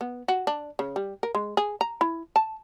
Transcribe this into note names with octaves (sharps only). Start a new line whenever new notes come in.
B3
F#4
D4
C#3
G3
A#4
G#3
G#4
A#5
E4
A5